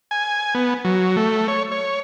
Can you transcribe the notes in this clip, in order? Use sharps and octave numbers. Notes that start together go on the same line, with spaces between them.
G#5
B3
F#3
A3
C#5
C#5